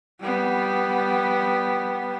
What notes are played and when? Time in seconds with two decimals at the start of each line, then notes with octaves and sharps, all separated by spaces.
0.21 G3 B3